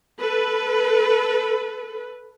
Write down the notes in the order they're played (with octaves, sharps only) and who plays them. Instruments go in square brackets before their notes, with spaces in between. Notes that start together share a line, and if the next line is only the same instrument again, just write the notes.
[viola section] A4 B4